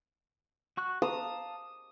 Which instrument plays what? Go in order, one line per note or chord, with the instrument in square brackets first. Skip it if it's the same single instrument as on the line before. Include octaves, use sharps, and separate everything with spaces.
[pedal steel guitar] F#4 C#6 F#6
[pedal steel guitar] F5 A5 A#5 [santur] D#6